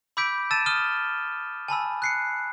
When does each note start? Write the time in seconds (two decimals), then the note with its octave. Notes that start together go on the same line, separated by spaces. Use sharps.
0.17 B5 D6 E6 G6 B6 D7
0.51 A5 E6 A6 D#7 E7
0.66 D#6 F6 D#7 G7
1.68 G#5 A5 B5 E6
2.02 F#6 C7 C#7